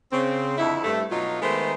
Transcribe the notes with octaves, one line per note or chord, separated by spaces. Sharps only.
C#3 C4
F2 D3 D#4 E4
G2 A3
B2 F#3 D#4 F4
D#3 G#3 A3 B3 A#4 C5